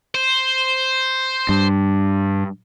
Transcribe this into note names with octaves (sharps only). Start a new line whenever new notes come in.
C5
G2